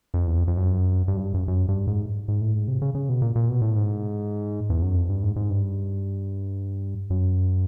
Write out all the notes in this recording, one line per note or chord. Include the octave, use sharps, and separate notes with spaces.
F2
E2
F2
F2
F#2
G2
F#2
G2
F#2
F#2
G2
G#2
G#2
A2
G#2
C3
C#3
C#3
B2
A#2
A#2
B2
A2
G#2
E2
F#2
F2
G2
G#2
G#2
G2
F#2